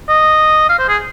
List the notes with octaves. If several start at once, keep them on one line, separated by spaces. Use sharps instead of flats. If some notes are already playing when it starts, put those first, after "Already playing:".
D#5
F5
C5
G#4